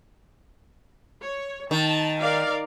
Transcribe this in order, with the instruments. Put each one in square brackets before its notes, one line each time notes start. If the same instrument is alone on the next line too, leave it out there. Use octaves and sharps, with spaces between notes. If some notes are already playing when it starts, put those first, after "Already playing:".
[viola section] C#5
[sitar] D#3 [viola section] A5
[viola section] A#4 D5 F5